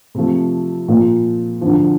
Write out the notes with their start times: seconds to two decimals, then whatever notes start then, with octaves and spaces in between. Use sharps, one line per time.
0.15 C3 F3 A3
0.88 A#2 F3 A#3 F4
1.61 D2 D3 F3